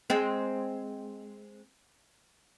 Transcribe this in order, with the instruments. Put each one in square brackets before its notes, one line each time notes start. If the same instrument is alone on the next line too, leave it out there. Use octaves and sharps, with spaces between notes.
[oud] G#3 C4